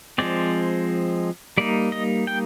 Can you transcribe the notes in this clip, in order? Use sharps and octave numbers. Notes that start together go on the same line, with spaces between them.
F3 G#3 C4 D5
G3 A#3 D#4 D5
D#5
G5